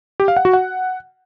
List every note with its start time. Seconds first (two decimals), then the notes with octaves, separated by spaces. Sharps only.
0.20 G4
0.28 F5
0.37 F#5
0.45 F#4
0.53 F#5